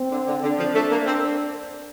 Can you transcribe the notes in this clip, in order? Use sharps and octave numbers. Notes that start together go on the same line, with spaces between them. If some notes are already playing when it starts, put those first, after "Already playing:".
Already playing: C4
D3
D3
D3 D4
F3
A3
A#3
C4